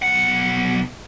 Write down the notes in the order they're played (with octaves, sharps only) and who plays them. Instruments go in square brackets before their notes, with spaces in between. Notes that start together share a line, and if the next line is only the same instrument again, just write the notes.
[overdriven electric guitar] B1 F#5